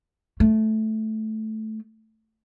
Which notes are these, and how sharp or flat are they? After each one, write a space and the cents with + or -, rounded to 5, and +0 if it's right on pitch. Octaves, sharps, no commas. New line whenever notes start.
A3 -10